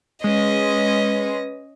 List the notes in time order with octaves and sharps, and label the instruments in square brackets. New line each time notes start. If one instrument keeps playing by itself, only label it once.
[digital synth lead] G#3 [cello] C#4 [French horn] B4 [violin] D#5